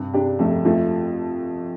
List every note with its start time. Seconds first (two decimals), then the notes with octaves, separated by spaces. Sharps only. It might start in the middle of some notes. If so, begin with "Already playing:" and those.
Already playing: G2 C3
0.14 C3 D4 G4
0.39 F2 F3 A3
0.65 F2 F3 A3